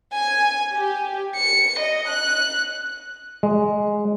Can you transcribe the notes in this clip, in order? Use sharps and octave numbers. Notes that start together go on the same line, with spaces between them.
G#5
G4
C#7
D#5
F#6
G#3